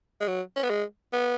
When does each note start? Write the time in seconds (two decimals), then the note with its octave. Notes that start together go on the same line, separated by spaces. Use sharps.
0.21 G#3
0.28 F#3
0.56 C#4
0.63 B3
0.70 G#3
1.13 B3